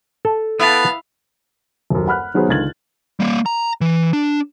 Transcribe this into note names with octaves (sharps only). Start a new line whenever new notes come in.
A4
B3 E4 B4 F5 A5
D#1 F#2
F#5 B5 F6 F#6
D#3 F#3 B3 G#4 B4 C5
C#2 D3 D#3 G#6 A6 F#7
G3 A#3
A#5
E3
D4